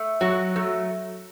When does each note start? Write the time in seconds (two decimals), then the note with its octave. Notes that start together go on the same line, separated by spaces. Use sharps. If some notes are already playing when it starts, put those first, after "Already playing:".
Already playing: A3
0.21 F#3 F#4
0.56 F#3 A3